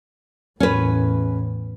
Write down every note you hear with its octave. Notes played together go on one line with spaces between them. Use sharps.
E2 A2 C#4 B4